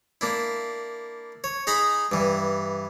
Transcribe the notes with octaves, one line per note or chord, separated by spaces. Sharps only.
A#3 D4 E4
C#5
D#4 G#4 A#5 B5
G2 E3